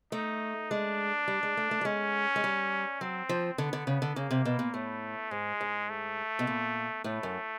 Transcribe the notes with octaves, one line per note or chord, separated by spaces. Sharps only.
A3 D#4
G#3 D4
G3
G#3
A3
A3
G3
G#3 C#4
G#3
G3
F#3 C4
F3
D3 B3
D3
C#3
D3
C#3 A#3
C3
B2
A#2
A2 A3
G#2 G#3
G#2
A3
B2
A#2
A2 A3
F#2